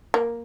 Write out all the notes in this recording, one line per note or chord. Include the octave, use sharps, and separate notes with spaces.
A#3